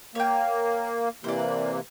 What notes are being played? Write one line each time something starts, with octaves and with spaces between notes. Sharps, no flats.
A#3 C#5 G5
C3 E3 A#3 C5 D5